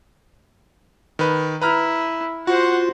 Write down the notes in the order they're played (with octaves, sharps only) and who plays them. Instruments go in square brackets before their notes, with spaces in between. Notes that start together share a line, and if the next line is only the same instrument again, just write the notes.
[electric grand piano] D#3 B4
[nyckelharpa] E4 [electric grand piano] B4 A#5 F6
[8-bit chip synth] F4 [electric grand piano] F#4 [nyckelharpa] C5 F#5